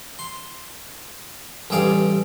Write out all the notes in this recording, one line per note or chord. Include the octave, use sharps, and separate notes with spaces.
C6
A1 G2 G#4 D5 F5